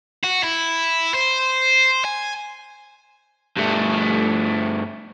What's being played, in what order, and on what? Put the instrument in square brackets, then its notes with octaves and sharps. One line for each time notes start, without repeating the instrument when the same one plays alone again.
[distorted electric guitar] F#4
E4
C5
G#5
[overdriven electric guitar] G2 A3